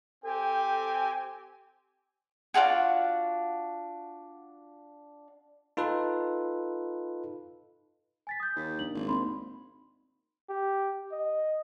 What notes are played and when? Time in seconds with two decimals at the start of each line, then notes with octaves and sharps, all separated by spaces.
0.25 C4 G4 A4 G5 G#5
2.54 D4 F4 F#4 G#4
5.77 D#4 F4 A4 B4
8.27 G#5 A6 B6
8.40 D#6 G6
8.56 D#2
8.79 A#3 D4 F#7
8.94 G#1
9.08 A#3 C4 D#4 B5 C6
10.49 G4
11.12 D#5